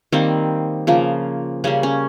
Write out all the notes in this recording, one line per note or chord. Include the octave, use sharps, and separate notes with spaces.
D#3 G3 A#3 C4
C#3 F3 A#3
C#3 G3 A#3 C#4
C#4